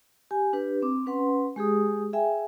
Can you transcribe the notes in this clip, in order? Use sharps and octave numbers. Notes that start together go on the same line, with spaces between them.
G4 G#5
D4 G4 B4
C4 D6
C#4 B4 F#5 C6
G#3 G4 G#4 D#6
G#4 E5 G5 G#5